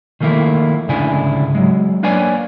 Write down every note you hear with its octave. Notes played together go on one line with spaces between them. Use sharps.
D#3 F3 A3 A#3 E4
D2 G#2 C#3 D4 E4 G#5
F#3 G#3
A#3 D4 B4 C#5 D5 G#5